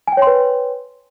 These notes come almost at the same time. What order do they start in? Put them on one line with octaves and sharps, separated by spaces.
G#5 G5 C#5 C6 B4